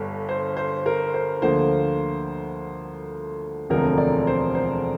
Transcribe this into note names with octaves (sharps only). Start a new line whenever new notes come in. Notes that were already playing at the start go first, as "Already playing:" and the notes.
Already playing: G1 G2 D3
C5
C5
A#4
C5
D2 D3 F3 A#3 F4 C5
E1 D2 D3 F3 C4 A#4
D5
C5
C5